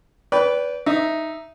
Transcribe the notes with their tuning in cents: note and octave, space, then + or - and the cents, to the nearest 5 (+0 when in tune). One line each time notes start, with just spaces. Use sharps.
B4 +0 D5 -35 G5 +0
D#4 +0 E5 +0